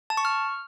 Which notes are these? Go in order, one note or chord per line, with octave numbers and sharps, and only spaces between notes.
A5
C#6
F6